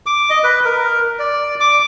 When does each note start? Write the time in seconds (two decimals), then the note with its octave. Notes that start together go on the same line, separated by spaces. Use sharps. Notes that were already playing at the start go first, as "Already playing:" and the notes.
0.06 D6
0.30 D#5
0.44 B4
0.65 A#4
1.19 D5
1.60 D6